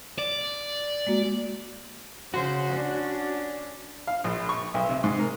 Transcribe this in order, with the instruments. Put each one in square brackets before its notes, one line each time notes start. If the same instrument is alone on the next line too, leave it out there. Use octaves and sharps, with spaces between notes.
[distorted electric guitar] D5
[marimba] G#3 A#3 F#4
[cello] C#3 C5 [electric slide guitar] F#4
[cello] C#4 D4
[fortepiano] F5
A#1
C#6
B1
C3
G#2
A#4